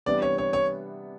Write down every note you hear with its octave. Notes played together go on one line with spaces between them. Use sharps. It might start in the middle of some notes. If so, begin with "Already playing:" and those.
C3 E3 G3 B3 D4 D5
C#5
C#5
C#5